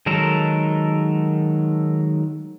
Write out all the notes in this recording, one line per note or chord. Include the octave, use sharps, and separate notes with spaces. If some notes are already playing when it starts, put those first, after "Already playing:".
D#3 F#3 G#3 A4 A#4